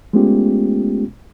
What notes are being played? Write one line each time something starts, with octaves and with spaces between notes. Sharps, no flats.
G#3 A3 B3 C#4 F4 G4